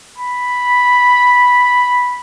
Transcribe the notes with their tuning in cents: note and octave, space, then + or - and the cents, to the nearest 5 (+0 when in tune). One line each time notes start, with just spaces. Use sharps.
B5 -5